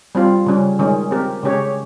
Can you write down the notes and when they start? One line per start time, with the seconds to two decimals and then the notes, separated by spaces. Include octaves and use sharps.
0.15 G3 C4 F4
0.46 C#3 G3 C#4
0.79 D#3 G#3 C#4
1.11 C4 G4 A#4
1.43 C#3 G#3 C#4 G4 C#5